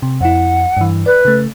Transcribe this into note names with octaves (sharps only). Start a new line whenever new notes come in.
C3
F2 E4 F#5
G2 E3
B4 D5
C#3 A3